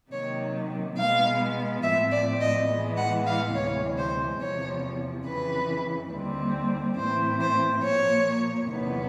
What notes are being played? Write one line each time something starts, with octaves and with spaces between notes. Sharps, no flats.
C3 D#3 F#3 A#3 C#5
B2 G#3 B3 F5
A2 F3 A3 C4 E5
D5
D#5
A2 E3 G#3 B3
F#5
F5
D2 C3 E3 G#3 C#5
C5
E2 C3 F3 C#5
F2 C#3 E3 B4
D#2 D3 G3 C4
A2 E3 A3 C4 C5
C5
A#2 F3 A#3 C#5
E2 C3 D#3 F#3 B3